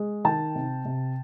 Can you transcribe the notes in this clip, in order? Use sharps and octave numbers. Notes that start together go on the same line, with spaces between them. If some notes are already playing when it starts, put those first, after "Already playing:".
Already playing: G#3
D#3 G5 A5
C3
C3